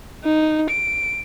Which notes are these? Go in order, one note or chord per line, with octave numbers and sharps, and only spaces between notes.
D#4
D7